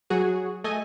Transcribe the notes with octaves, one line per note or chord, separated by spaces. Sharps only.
F#3 F#4 G#4
A3 D#5 G#5